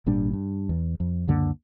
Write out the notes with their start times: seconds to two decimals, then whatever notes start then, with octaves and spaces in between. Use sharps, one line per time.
0.06 G#1 A#2 G3 D4
0.33 G2
0.69 E2
1.00 F2
1.27 C#2 F#2 D3 A#3